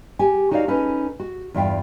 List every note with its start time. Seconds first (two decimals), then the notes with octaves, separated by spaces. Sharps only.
0.19 G4 G#5
0.51 D#4 F#4 A#4 C#5 D5 F5
0.68 C#4 D#4 A4 B4
1.20 F#4
1.54 E2 G2 D4 F4 E5 G5